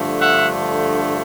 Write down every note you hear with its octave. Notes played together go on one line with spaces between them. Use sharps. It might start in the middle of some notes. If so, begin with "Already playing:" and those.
Already playing: G2 D3 F3 A3
E5 F#5